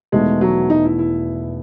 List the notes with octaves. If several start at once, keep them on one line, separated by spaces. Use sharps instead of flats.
E1 E2 D#3 G#3 A3
F#3
D#4
E4
E4